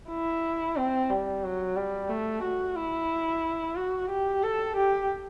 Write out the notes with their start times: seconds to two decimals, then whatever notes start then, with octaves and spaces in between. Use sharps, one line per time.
0.10 E4
0.76 C4
1.10 G3
1.43 F#3
1.76 G3
2.10 A3
2.43 F#4
2.76 E4
3.76 F#4
4.10 G4
4.43 A4
4.77 G4